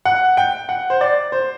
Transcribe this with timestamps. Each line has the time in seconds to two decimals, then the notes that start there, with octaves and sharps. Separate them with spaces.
0.05 F#5
0.37 G5
0.69 F#5
0.90 C5
1.01 D5
1.32 C5